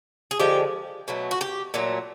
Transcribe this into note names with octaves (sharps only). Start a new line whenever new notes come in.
G#4
D3 F3 G#3 G4
B2 F#3 A3
F#4
G4
A#2 F#3 A3